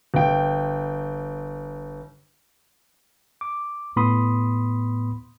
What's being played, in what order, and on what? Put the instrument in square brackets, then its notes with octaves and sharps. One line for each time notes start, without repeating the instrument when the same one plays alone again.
[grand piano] G1 G5
[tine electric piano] D6
A2 B3 B5 C6 D#6